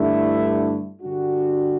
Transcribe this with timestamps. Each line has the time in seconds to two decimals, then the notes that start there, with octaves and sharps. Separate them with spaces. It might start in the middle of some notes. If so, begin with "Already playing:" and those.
Already playing: G2 D3 A3 E4
1.02 G2 D3 G3 D4 F#4